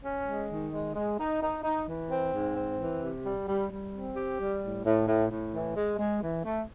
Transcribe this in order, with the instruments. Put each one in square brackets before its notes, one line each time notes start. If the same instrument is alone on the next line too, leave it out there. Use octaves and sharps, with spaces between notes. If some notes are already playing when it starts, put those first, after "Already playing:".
[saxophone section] C#4
G#3
D#3
G#3
G#3
D#4
D#4
D#4
E3
C4
G#2
C4
E3
C3
G3
G3
G3
C4
G4
G3
A2
A2
A2
A2
E3
G#3
G#3
E3
A3